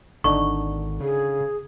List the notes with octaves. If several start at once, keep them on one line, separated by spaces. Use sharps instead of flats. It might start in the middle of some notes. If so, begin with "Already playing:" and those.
G#1 D3 D4 D#4 C#6
C#3 G#4